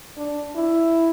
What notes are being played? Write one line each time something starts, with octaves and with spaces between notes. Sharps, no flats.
D4
E4